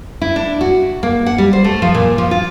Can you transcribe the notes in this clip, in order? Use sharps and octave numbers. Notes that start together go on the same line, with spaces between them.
E4
D4
F#4
A#3
F#5
G3
C5
A3
F3
A#2
F3
F4